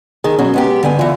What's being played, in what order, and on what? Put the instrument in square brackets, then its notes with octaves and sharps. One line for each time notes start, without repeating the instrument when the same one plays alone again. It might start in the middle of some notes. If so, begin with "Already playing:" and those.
[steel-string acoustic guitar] D#3 [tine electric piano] G#4
[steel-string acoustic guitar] B2 F#3 [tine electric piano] C#4
[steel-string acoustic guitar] G#3 B3 G4
[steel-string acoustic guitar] G2 B3 G#5 [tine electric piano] D3
[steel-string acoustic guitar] D3 E3 [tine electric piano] F4